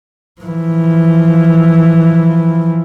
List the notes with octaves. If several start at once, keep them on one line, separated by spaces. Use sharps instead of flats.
E3 F3